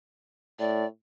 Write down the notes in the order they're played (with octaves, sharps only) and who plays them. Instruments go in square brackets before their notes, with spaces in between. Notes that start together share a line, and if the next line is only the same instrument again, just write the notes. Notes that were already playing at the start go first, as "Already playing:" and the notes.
[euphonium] A2 [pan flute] D5